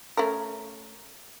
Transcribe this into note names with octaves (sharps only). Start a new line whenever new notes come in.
A3 C#4 A#4